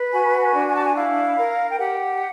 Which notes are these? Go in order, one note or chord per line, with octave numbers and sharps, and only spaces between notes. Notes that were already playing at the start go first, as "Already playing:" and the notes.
Already playing: B4
F#4 G#5
G#5
D4
G#5
A5
G#5
E4 F5
A#4
G5
G4 F#5